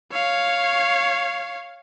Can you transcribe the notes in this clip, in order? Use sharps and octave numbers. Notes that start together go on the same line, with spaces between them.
C#5 F5